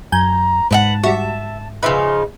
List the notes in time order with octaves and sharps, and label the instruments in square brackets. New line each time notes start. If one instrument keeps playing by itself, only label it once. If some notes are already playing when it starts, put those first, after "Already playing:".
[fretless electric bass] F#2 [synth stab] G#5 G6 [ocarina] A#5
[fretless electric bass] G#2 [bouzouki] B4 E5 F#5 [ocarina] A5
[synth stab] G3 F#4 [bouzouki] E5
[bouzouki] C#3 F3 D#4 [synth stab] B4 E5 [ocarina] C6